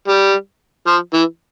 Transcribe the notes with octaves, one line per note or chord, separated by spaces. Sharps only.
G3
F3
E3